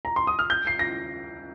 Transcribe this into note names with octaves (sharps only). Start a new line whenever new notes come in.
A#5
C6
D#6
F6
G6
C7
A#6